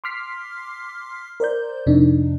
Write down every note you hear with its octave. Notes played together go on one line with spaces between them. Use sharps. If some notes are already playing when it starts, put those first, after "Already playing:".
C6 D6 F6 B6 C7
A#4 C5 D5 G6
F2 C3 D4 D#4